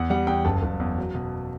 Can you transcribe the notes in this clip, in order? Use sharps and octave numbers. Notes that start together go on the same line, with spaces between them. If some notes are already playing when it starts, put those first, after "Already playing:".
Already playing: E2 F#5
G3 F#5
E2 G5
F#1 A5
F#1
E2
F#3
B2